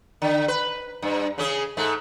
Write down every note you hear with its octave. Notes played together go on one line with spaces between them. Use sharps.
D3
B4
G2
C#3 C#4 G#4
G#2 A3